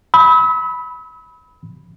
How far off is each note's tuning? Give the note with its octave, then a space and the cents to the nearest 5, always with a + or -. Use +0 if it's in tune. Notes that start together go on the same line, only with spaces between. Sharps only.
B5 +0 E6 -40